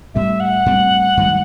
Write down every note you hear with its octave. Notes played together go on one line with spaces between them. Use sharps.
A2 G3 C4 E5
F#5
A2 G3 C4
G2 D#3 F#3 A3